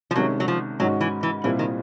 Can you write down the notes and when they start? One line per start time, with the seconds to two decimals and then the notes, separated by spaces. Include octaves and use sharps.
0.11 F3
0.15 C2 C3 D#3 F#3 G#3 C#4
0.40 F#3
0.48 F3
0.80 G#2 D#3 F#3 G#3 C#4 F#4
1.01 E3
1.23 E3
1.44 C2 A#2 E3 G3 C4 E4
1.59 D#3